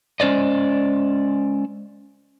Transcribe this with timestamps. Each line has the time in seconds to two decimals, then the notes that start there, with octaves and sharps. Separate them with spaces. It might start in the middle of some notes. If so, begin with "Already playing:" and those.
0.20 G#3 C#4 C5 D5 D#5